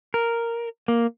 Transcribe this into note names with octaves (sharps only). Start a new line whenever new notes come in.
A#4
A#3